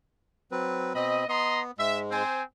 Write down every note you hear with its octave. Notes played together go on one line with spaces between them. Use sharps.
F#3 C4 B4
B2 C4 D#5 B5
B3 D#5 A#5 C6
G#2 G#3 E5
C4 C5 G#5